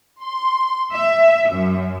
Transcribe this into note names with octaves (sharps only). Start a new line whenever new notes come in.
C6
E5
F#2